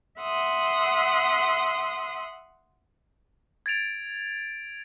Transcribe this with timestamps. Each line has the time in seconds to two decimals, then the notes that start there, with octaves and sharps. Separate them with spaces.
0.20 E5 F#5 C6 D#6
3.66 G#6 A6 D7 F7